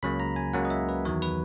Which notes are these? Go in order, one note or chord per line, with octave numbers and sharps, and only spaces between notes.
C#2 C#3 F#3 A#3 B5
A#5
G#5
C#2 C#3 F#3 A#3 F#5
D#5
E5
B4
E2 D#3 F#3 C#5
B4